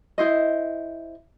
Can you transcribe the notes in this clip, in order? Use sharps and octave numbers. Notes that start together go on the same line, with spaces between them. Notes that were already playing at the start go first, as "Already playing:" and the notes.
E4 C5 D#5